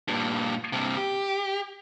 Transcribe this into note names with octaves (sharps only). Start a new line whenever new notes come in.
G2 A#2
G2 C3
G4